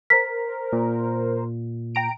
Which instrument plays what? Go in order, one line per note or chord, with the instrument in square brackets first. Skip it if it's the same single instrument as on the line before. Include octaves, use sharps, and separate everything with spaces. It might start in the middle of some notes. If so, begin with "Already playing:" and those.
[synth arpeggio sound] A#4 C5 [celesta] B6
[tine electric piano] A#2
[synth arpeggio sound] G5 A#5 D7